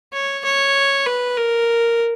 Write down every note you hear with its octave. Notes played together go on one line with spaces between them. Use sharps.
C#5
C#5
B4
A#4